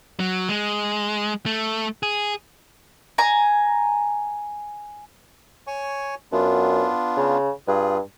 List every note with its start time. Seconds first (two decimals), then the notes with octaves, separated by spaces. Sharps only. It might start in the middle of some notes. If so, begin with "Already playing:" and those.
0.20 F#3
0.49 G#3
1.46 A3
2.03 G#4
3.18 G#5 A#5
5.67 C#5 G#5 C#6
6.32 F#2 B3 D4 F4
7.17 C#3
7.68 G2 F4 G#4